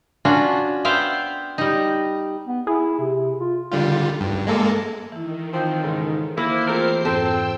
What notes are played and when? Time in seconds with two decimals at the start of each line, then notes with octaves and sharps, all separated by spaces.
0.25 C#4 D4 F4 F#4
0.85 B3 C5 E5 F5 G5
1.58 G3 D#4
2.47 B3
2.67 E4 G#4
2.99 C3
3.39 F4
3.72 D3 G3 F4
4.21 G2
4.47 G#3 A#3 A4
5.12 D#3 E3 E4
5.53 F3 C4
5.83 G#2 C#3 A4 A#4
6.38 A#3 E4 C5 C7
6.67 E3 A3 C4 F4 G#4 A#4
7.05 F2 G#2 C4 A4 G5 E6